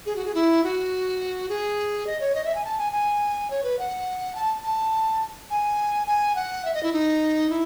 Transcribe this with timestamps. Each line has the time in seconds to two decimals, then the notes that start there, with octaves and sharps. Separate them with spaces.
0.06 G#4
0.16 F#4
0.25 G#4
0.35 E4
0.64 F#4
1.49 G#4
2.07 D#5
2.20 C#5
2.35 D#5
2.45 E5
2.55 G#5
2.65 A5
2.78 G#5
2.92 G#5
3.50 C#5
3.63 B4
3.79 F#5
4.35 A5
4.64 A5
5.50 G#5
6.07 G#5
6.35 F#5
6.65 E5
6.74 D#5
6.83 E4
6.93 D#4
7.50 E4